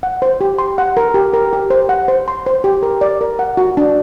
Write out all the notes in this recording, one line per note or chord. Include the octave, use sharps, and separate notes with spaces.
F#5
C5
G4
C6
F#5
A#4
G4
A#4
G4
C5
F#5
C5
C6
C5
G4
A#4
D5
A#4
F#5
F#4
D4